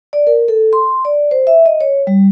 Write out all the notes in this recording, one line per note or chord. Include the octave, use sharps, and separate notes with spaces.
D5
A#4
A4
C6
D5
C5
E5
D#5
C#5
G3